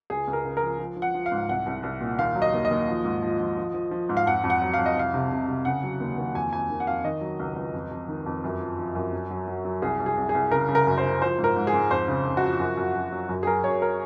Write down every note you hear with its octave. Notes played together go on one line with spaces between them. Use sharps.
C#2 G#4
C#2
A#4
C#3
A#4
F3
F3
F3
F#5
F3
F5
G#2
C2 F#5
C2
C2
A#2
D#2 F5
F#3
D#5
D#2
D#5
D#2
F3
G#2
F3
F3
F3
F3
F3
G#2
F5
F2 F#5
F2
F#5
F#3
F2 F5
D#5
C2 F5
C3
C3
C3
C#3 F#5
F#3
D#2
D#2
F2 G#5
F2 G#5
D#3
F#5
F2 F5
D#3 D#5
F#3
C#2
C#2
F2
F2
D#3
F2
F#2
F3
F3
F#2
F#3
F#3
F#3
F#3
C2 G#4
C2
G#4
C2
G#4
C2
C#3 A#4
C#3
A#4
F#2
C5
C#3
F3 C5
G#2
A#4
G#2
G#4
G#2
F2 C5
C#3
C#3
F#4
F3
F#2
F#2
F#2
F#3
F#2
G#4
F#3 A#4
F#2 C#5
A#4